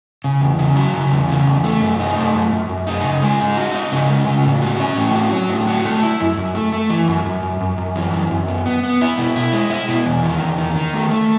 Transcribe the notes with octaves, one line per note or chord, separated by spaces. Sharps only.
C#3
E2
C#3
F#3
C#3
E2
C#3
E2
A3
F#2
D#4
A3
F#2
F#2
F#2
D#4
C#3
G#3
D#4
F#4
D#4
C#3
G#3
C#3
A2
F#4
C#4
A2
F#4
F#3
A2
F#4
A3
E4
F#2
F#2
A3
A3
E3
F#2
F#2
F#2
F#2
F#2
E3
F#2
F#2
B3
B3
B3
E4
B2
E4
G#3
E4
B2
E2
D#3
E2
D#3
D#3
A3
A3